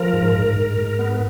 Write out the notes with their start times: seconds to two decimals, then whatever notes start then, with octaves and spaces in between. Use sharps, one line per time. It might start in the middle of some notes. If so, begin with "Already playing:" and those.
Already playing: F3 A#4
0.13 G#2
0.35 G#2
0.56 G#2
0.78 G#2
0.99 B3